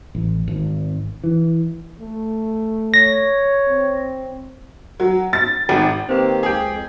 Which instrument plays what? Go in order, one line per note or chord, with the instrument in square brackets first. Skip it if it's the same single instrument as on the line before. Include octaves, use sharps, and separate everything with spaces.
[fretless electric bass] A1
G#1
E3
[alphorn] A3
[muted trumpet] C#5 [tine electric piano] A#6
[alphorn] C4
[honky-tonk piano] F#3
A6
G#1
[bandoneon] D#3 A#3 G4 [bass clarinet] C4 [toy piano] B4 C5
[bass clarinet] C#2 [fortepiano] G#4 G5
[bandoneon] F2